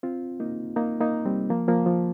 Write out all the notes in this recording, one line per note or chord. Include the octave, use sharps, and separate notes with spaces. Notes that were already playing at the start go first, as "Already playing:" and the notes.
C4 F4
A#3 D#4
A#3 D#4
A#3 D#4
G3 C4
F3 A#3
F3 A#3
F3